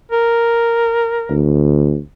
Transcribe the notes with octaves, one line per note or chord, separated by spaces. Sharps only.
A#4
D2